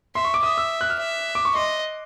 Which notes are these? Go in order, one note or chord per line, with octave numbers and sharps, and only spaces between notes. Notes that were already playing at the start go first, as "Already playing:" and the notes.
E5 C6
C#6
D6
E5 D#6
E6
F#6
F6
E5
D6
C#6
D#5 C6